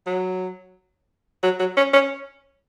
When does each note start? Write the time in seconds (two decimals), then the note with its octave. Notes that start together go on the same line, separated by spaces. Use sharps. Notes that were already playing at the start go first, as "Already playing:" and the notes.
0.07 F#3
1.43 F#3
1.60 F#3
1.77 C#4
1.93 C#4